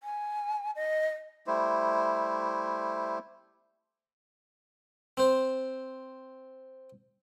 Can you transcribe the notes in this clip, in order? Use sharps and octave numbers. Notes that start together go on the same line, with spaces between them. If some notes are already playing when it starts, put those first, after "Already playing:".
G#5
D#5
G3 A3 E4 C5
C4 C5